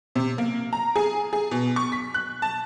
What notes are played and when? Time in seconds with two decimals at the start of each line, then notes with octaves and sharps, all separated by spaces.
0.16 C3
0.38 A#3
0.73 A#5
0.96 G#4
1.33 G#4
1.51 B2
1.76 C#6
1.92 B6
2.14 F#6
2.42 A5